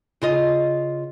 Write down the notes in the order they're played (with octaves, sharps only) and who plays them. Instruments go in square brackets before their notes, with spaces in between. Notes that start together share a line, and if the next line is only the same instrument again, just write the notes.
[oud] C#3 F4 D#5